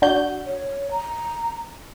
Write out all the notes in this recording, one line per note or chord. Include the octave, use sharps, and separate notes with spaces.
D4 F#4 G6
C#5
A#5